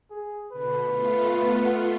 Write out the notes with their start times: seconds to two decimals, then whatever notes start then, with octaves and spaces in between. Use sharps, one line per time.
0.11 G#4
0.52 B2 D3 B4
0.84 A3 B3 F4
1.66 F#5